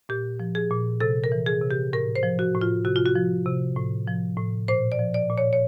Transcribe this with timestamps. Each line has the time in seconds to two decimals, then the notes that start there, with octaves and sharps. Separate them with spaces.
0.09 A#2 G4
0.40 F3
0.55 G#4
0.71 A#2
1.01 C3 A4
1.24 A#4
1.32 E3
1.46 G#4
1.62 C3
1.71 G4
1.93 A2 A#4
2.16 C5
2.23 F3
2.39 F#4
2.54 A2
2.61 F4
2.85 C3 F#4
2.96 F4
3.06 F#4
3.15 F3
3.46 C3
3.76 A2
4.07 F3
4.37 A2
4.68 A#2 C5
4.92 D5
4.99 F3
5.14 D5
5.29 A#2
5.38 C#5
5.53 C#5